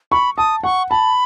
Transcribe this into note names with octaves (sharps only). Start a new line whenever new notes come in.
B5 C#6
A5 D#6
F#5 C#6
A5 B5